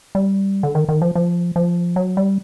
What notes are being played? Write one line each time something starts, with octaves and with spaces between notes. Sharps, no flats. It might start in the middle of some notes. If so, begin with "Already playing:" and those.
G3
D3
D#3
D#3
F3
F3
F3
F#3
G3